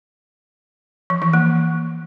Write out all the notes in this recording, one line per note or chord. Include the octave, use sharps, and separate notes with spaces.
F3
E3
A#3